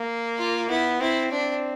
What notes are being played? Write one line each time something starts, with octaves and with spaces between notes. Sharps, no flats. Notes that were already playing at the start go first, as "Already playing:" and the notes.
Already playing: A#3
F4
B3 E4
C4 E4
C4 D4